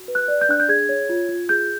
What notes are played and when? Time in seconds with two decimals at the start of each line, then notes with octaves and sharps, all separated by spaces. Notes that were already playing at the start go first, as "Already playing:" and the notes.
Already playing: F#4
0.08 B4
0.15 F#6
0.28 D5
0.41 G6
0.49 D4 F#6
0.60 G6
0.69 G#4 G#6
0.89 C#5
1.09 F4
1.29 F4
1.49 G#4 G6